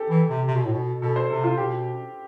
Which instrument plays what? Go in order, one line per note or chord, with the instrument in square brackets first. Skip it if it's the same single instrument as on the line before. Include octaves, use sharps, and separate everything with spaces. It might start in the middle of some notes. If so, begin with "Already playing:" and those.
Already playing: [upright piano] G4 A4
[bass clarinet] E3
C3
C3
B2
A2
B2
[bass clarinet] B2 [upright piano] A4
[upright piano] C5
[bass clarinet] C3 [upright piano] A4
[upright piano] F4
[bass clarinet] B2 [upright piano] G4